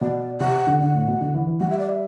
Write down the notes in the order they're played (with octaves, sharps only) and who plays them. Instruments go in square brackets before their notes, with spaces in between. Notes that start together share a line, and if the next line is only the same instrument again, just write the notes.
[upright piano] B2 [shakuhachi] D5
[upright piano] C3 [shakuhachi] F#5
[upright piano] D3
[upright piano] D3 [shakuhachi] F#5
[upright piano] A2
B2
D3
E3
E3
[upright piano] G3 [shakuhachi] F#5
[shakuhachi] E5
D5
E5